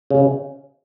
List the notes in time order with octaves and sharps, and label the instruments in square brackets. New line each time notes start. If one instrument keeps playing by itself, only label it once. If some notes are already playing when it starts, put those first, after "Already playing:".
[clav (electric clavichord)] C#3